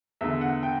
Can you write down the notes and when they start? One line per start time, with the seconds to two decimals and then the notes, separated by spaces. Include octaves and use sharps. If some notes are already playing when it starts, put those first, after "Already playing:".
0.21 E2 D3 E5
0.41 F#5
0.63 G5